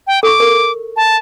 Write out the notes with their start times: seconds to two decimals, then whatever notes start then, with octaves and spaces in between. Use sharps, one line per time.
0.07 G5
0.23 A4 C#6 D6
0.40 A#4
0.96 A5